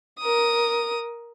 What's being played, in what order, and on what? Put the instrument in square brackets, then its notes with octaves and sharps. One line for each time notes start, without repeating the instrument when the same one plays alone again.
[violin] A#4 D#6